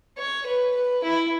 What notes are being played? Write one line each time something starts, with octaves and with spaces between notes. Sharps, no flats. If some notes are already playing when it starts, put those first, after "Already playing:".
C#5
B4
B4
E4